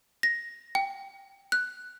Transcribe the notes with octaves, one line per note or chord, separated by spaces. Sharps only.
A#6
G5
F#6